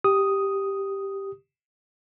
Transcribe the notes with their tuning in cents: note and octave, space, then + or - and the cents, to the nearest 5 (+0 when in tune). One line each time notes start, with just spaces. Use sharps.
G4 +0 D#6 +0